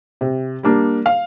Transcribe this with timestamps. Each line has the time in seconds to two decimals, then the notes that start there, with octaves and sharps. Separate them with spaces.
0.21 C3
0.63 G3 A#3 D4
1.06 F5